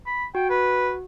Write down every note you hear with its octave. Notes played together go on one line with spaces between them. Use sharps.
B5
F#4 G5
B4